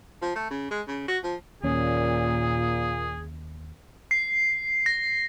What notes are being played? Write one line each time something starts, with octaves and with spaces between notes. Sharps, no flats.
F3
A3
C#3
G#3
C#3
F#4
F3
D#2 A#2 C#4 G#4
C7
A#6